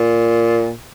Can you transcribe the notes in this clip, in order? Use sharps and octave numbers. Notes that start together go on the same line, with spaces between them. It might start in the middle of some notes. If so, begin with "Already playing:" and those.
Already playing: A#2